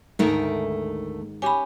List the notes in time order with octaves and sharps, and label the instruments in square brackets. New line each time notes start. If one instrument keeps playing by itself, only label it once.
[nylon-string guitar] D2 A3 A#4 [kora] G#2 D#3
[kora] C#4 G4 [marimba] G#5 B5